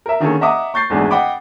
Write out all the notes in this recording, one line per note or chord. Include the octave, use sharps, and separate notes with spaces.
A#4 E5
D3 D#3 A#3 C#4 G#4 A4
D#5 E5 F#5 A#5 D6 D#6
C#6 G6 A6 C7
G#1 E2 G#2 A3 D4 G#4
D#5 F#5 G5 B5 D6